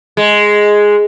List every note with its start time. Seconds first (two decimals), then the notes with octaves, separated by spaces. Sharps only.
0.17 G#3